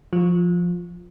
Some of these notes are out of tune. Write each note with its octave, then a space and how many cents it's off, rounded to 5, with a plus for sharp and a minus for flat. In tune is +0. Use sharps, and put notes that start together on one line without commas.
F3 +0 F4 +20